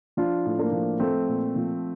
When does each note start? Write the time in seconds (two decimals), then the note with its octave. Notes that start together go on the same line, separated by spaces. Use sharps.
0.17 F3 D4 F4
0.46 A2
0.58 A#3 D4
0.72 F3
1.00 F3 A3 C4
1.28 A#2
1.56 F3